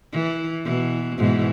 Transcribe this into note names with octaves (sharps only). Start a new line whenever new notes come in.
E3
B2 E3
G#2 B2 E3